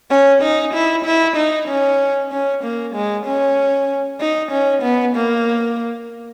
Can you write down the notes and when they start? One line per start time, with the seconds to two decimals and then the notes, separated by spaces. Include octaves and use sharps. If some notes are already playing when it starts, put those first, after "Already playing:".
0.10 C#4
0.42 D#4
0.74 E4
1.05 E4
1.36 D#4
1.68 C#4
2.32 C#4
2.63 A#3
2.95 G#3
3.26 C#4
4.20 D#4
4.51 C#4
4.83 B3
5.15 A#3